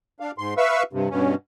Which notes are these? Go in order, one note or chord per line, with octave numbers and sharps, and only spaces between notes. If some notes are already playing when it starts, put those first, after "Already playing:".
D4 F5
G#2 C6
B4 E5 F5 C#6 E6
G2 C3
G2 B2 C#4